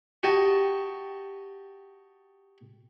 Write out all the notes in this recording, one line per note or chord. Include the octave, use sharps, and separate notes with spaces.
F#4 G4 D#5 A5